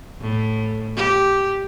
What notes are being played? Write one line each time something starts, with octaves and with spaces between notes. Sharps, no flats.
A2
G4